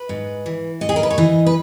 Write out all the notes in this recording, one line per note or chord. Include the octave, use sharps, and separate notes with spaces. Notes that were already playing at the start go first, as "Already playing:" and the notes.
Already playing: B4
G#2
E3
G#2 D#5
G#4
A#4
B4
C#5
E3 D#5
B4